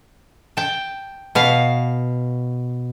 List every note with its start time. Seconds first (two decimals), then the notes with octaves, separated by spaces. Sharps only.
0.57 G5 A5
1.35 B2 F5